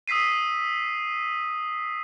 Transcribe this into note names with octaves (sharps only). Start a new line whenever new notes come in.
D#6 E6 B6 C7 D#7